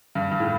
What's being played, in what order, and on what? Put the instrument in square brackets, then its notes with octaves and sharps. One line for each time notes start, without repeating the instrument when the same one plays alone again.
[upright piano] G2
G2
A2